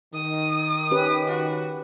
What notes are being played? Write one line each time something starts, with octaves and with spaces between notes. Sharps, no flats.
D#3 D#6
C#4 G4 B4
F#4